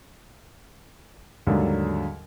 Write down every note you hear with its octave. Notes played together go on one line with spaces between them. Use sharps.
D#2 G#2 D3 F#3 G3